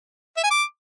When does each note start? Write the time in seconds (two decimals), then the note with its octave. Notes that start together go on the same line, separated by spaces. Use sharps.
0.37 E5
0.44 G#5
0.51 D6